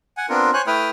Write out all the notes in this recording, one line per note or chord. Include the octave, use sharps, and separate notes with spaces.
F#5 G#5
B3 C4 D4 F4 A#4
C5 C#5 G#5 F#6
A3 E4 B4 G5 D#6 F6